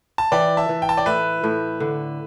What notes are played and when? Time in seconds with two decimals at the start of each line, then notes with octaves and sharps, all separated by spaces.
0.18 A5
0.32 E3 D5 G5
0.57 E5 A5
0.69 E3
0.82 G5
0.89 A5
0.97 D5 G5
1.06 A2 B4 E5
1.44 A2
1.80 D3